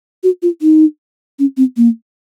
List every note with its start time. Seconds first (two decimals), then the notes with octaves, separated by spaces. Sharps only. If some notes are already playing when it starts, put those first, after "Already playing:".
0.24 F#4
0.43 F4
0.62 D#4
1.39 C#4
1.57 C4
1.77 A#3